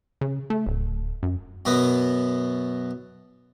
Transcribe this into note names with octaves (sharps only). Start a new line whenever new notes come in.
C#3
A3
D1
F#2
F#2 B2 B3